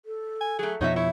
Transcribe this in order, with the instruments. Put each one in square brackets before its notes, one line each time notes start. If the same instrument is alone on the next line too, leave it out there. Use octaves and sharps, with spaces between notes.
[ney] A4
[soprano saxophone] G#5
[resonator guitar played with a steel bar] F#3 A3 [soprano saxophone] G#4
[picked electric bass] F2 B2 F3 [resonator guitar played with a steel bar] D#4 F#4 E5 [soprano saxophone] C#5
[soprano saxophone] E4 [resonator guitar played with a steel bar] C#5 [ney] E5